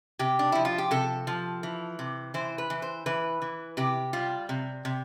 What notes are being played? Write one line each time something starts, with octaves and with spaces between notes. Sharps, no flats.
C3 G4
D4
F3 E4
F4
G4
C3 A4
F3
E3
C3
E3 C5
B4
E3
C5
E3 B4
E3
C3 G4
G3 F4
C3
C3